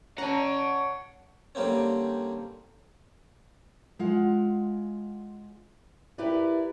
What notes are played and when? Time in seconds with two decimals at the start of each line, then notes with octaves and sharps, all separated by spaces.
0.18 C#4 C#5 F#5 A5 A#5
1.55 D3 G3 A#3 C4 C#4
3.99 G#3 F4 F#5
6.18 E4 G4 A#4 B4 D5